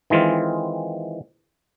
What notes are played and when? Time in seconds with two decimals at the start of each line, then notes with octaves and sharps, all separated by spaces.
0.10 D#3 E3 G#3 C4 F4